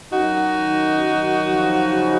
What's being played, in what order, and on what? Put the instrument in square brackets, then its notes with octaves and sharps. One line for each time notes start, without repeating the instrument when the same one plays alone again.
[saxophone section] F#2 D#4 F#4
D#3
F#2
F3
C#3